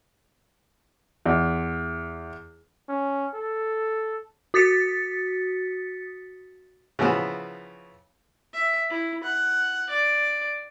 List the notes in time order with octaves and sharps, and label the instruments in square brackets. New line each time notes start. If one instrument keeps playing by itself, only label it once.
[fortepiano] E2
[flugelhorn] C#4
A4
[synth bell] F#4 D#6 A6 B6 C#7
[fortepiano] C#3 E3 F3 B3
[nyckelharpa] E5
E4
F#5
D5